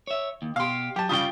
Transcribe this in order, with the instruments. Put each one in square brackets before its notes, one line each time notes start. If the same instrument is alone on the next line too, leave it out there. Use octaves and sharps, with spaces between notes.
[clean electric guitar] C#5 E5
D#2
[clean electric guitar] B2 G4 [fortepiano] F5 C6
[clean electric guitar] F#3 [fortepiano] G4 A5
[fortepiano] C#3 G3 D#6 [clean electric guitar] F4 G5